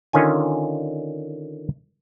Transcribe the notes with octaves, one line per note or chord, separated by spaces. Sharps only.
D3 D#3 C#4 F4 G#5